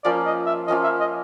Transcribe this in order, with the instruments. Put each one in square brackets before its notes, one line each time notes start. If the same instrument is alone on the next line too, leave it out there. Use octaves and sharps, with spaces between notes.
[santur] F3 A#3 C#4 F4 [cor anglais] D5
[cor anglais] D#5
E5
[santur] F3 A#3 C#4 F4 [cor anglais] D#5
[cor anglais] E5
D#5